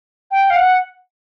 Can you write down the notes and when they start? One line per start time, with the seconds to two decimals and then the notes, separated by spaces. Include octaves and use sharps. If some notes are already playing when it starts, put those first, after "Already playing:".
0.31 G5
0.50 F5
0.56 F#5